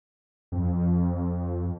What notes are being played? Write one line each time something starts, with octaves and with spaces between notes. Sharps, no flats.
F2